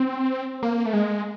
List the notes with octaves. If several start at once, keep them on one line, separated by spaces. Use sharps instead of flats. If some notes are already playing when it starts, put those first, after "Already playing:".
Already playing: C4
A#3
A3
G#3